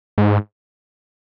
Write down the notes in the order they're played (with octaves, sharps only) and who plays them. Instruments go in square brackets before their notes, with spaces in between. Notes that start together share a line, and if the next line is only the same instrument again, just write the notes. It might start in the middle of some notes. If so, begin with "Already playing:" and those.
[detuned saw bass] G#2